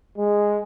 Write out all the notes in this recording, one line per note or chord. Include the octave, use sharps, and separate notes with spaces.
G#3